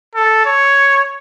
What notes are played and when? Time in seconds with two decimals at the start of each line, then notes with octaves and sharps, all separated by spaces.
0.15 A4
0.46 C#5